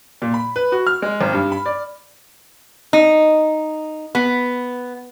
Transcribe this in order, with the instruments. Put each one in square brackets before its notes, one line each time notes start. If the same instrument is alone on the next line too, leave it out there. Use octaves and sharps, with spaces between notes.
[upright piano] A#2
B5
B4
F#4
F6
G#3
G#1
G2
B5
D5
[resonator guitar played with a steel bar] D#4
B3